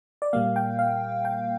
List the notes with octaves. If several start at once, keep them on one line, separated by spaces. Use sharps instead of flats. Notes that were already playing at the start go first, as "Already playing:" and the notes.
D5
A#2 G3 A#3 F5
G5
F5
G5